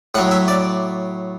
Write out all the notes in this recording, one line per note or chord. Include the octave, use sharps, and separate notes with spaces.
A2 F#3 F#5
E5
D5